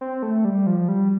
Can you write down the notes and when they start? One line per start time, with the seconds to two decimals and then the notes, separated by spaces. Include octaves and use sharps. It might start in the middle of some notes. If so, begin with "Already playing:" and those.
0.01 C4
0.23 A3
0.45 G3
0.67 F3
0.88 G3